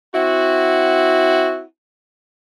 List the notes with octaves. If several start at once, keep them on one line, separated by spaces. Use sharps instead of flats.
C4 E4 F#4